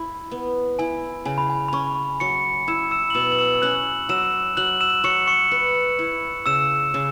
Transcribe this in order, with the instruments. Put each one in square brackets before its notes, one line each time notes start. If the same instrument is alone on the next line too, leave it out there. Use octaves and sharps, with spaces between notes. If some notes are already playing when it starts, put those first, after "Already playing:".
Already playing: [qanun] E4
B3
[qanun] E4 [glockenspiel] G#5
[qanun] C#3 [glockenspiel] G#5
[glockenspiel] B5
G#5
B5
[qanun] C#4 [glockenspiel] C#6
[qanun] F#3 [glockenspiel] C#6 C#7
[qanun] E4 [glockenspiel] E6 E7
[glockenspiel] E6 E7
F#7
[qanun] B2 [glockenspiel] E6 E7
[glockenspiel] F#7
E6 E7
[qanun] C#4 [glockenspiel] F#6 F#7
[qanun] F#3 [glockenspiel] E6 E7
[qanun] F#3 [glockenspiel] F#6 F#7
[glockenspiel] E6 E7
[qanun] F#3 [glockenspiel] C#6 C#7
[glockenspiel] C#6 C#7
[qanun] B4
E4
[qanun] C#3 [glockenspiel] E6 E7
[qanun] C#3